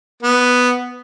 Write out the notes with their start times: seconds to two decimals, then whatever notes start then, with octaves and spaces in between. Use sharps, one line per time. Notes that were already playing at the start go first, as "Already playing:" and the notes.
0.23 B3